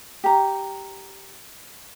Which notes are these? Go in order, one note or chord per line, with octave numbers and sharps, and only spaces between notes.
G4 A#5